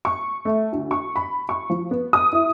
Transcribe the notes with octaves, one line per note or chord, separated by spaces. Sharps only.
C#6
A3
D2
C#6
B5
C#6
F3
B3
D#6
E4